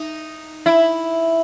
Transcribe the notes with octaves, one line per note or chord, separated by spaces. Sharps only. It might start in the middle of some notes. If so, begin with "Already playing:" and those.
Already playing: D#4
E4